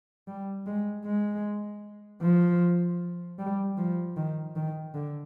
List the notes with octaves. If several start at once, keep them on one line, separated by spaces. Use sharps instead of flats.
G3
G#3
G#3
F3
G3
F3
D#3
D#3
D3